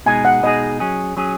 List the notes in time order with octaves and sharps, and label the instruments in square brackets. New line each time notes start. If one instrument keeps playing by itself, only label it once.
[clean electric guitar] B2 G#3 D#4 G#4 [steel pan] G#5
[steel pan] F#5
[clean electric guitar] B2 G#3 D#4 G#4 [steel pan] D#5
[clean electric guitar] F#3 C#4 G#4
F#3 C#4 G#4